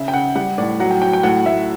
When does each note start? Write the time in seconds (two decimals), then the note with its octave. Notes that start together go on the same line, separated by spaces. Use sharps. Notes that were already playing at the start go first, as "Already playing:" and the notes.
Already playing: C#3 E5
0.08 G5
0.13 C#3 F#5
0.35 G3 F#5
0.58 A2 D5
0.80 F#3 F#5
0.91 G5
1.01 F#3 G5
1.13 G5
1.23 A2 F#5
1.46 A2 E5